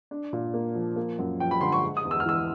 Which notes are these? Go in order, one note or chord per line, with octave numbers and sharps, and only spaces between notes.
D4
A#2
A#3
F3
A#3
F#2
F3 G5
B5
D3 C6
C#6
G#3
D#6
E2
E6
F6
E3 E6